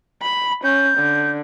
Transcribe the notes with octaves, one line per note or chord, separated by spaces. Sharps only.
B5
C#4 G6
D3